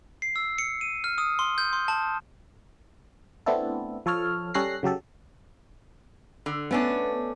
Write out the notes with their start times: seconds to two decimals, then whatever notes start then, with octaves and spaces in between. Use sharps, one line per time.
0.22 C7
0.36 E6
0.58 C#7
0.81 D#7
1.04 F6
1.18 D#6
1.39 C6
1.58 G6
1.73 C6
1.88 A5
3.46 A3 B3 C4 D4 E4 A4
4.06 F3 A4 C#5 F6
4.54 G3 C#4 A4 F#6 A#6 C7
4.83 C#3 F#3 G4 A4
6.46 D3
6.71 A3 B3 C#4 D4